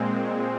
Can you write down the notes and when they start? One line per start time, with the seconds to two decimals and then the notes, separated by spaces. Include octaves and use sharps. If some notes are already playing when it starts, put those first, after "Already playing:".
Already playing: A#2 G#3 C4
0.17 C#6